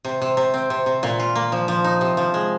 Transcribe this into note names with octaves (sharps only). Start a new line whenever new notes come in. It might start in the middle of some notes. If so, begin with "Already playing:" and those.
C3
C3
C3
C4
C3
C3
A#2
F4
A#3
F3
F3
D#4
C3
F3
G#3